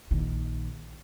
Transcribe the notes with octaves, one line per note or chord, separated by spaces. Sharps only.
A#1 D#3